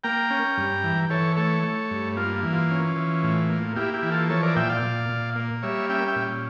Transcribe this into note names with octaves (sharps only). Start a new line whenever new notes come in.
A#3 G5 A#5
C#4
G2
E3
E3 A4 C#5
A3 A4 C#5
A3
G2
A#3 F4
E3
F4
C#4
E3
A2
A#3
A#3 E4 G4
E4 G4
E3
F4 A4
F3 A4 C#5
A#4 D5
A#2 E5 G5
D5 F5
A#2
A#2
A#3
G3 C#5 E5
C#4 E5 G5
E5 G5
A#2